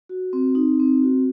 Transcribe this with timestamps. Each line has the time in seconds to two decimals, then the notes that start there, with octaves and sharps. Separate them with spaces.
0.09 F#4
0.33 C4
0.55 D#4
0.79 C4
1.02 F#4